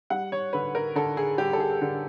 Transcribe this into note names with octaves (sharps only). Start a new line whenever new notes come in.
G3 F#5
C#5
D3 B4
A#4
D3 A4
G#4
G3 G4
A4
G#4
D3